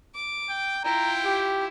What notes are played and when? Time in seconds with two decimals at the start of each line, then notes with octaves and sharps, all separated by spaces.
0.15 D6
0.50 G5
0.84 E4 F4 G5 A#5
1.25 G4